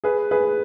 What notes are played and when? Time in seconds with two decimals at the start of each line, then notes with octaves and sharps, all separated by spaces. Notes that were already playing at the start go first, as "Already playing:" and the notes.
0.04 G#4 B4
0.31 G#4 B4